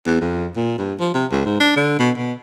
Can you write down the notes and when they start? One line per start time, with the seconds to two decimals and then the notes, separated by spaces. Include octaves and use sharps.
0.06 E2
0.21 F2
0.56 A#2
0.78 G2
0.99 F3
1.14 C3
1.31 C#2
1.45 G#2
1.60 D4
1.76 D3
1.99 B2
2.17 B2